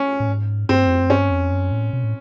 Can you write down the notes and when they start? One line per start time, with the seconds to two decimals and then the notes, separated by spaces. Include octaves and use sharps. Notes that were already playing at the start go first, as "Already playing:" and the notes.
Already playing: C#4
0.20 A2
0.28 G#2
0.69 G2 C4
0.87 F2
0.99 F#2
1.10 G2 C#4
1.31 F2
1.52 F#2
1.72 A2
1.93 B2
2.04 A2